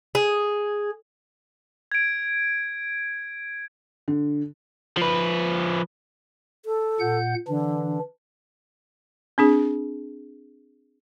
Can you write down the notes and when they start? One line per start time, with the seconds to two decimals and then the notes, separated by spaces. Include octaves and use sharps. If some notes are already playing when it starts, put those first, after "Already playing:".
0.15 G#4
1.92 G#6 D7
4.08 D3
4.97 F3 B4
6.65 A4
7.00 A#2 F#5 G6
7.48 D3 E3 D4
9.38 C4 D4 G#4